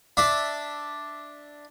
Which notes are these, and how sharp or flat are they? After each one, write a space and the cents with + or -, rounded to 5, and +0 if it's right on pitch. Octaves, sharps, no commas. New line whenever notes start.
D4 +0 E5 -5